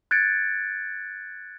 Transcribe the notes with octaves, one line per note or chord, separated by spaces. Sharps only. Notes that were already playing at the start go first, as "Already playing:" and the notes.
F#6 G#6 A6 C#7 D7